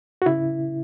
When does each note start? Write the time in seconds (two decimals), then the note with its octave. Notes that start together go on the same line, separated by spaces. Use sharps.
0.22 F#4
0.26 C#3 E4